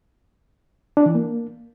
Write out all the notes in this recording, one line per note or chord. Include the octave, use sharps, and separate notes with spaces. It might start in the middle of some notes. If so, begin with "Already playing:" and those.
D4
E3
A#3